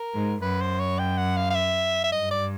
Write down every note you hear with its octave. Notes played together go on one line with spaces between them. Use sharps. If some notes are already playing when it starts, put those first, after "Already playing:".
Already playing: A#4
G#2
F#2 B4
C5
C#5
G5
F#5
F5
F5
E5
E5
G2 D#5
D5